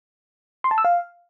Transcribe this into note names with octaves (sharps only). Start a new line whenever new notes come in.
C6
A5
E6
F5